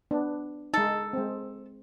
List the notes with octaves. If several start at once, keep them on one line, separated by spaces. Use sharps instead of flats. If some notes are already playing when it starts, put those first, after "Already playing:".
B3 D4
G#3 D#4 A4
G#3 C4